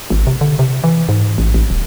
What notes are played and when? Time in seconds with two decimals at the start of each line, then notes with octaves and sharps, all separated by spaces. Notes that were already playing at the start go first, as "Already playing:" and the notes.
0.10 G#1
0.27 C3
0.41 D3
0.59 C3
0.84 E3
1.09 G#2
1.38 A1
1.54 A1
1.70 D#1